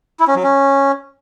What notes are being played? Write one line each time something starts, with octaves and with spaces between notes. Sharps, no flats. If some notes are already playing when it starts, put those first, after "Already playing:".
E4
C#4
F#3
C#4